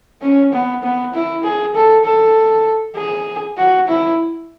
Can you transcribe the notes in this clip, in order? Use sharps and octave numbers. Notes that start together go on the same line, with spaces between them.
C#4
B3
B3
E4
G#4
A4
A4
G#4
F#4
E4